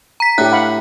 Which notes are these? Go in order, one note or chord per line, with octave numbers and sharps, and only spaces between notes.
A#5 B6
A2 D4 G4 F#6
F5 F#5 B5